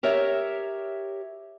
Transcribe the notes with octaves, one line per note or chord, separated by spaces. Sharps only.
G4 A#4 C#5 E5